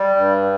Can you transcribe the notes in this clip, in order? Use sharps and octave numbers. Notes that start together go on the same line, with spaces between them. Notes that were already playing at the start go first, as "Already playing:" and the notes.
Already playing: G3
G2